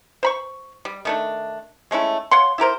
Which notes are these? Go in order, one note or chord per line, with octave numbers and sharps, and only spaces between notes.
C5 B5 C#6
G3
D#3 A3 D4
G#3 A3 C#4 E4
C#5 F5 F#5 C6
E4 G4 A#4 C5